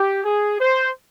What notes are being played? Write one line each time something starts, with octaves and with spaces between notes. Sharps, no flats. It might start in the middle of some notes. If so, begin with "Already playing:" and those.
Already playing: G4
G#4
C5